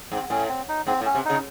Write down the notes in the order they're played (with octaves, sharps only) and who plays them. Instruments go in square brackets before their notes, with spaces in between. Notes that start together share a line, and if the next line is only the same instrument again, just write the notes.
[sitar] G#2 [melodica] C4
[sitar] A2 [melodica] C#4
[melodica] C4
D#4
[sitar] G#2 [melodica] C4
[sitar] A2
[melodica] C#4
[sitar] C3
[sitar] C#3 [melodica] D#4